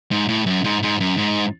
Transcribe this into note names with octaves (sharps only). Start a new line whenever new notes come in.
G#2
A2
F#2
G#2
G#2
F#2
G#2